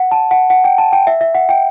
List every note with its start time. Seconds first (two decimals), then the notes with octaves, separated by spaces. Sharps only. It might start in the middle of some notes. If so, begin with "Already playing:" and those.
Already playing: F#5
0.11 A5
0.31 F#5
0.50 F#5
0.64 G5
0.78 A5
0.93 G5
1.07 E5
1.21 E5
1.35 F#5
1.49 G5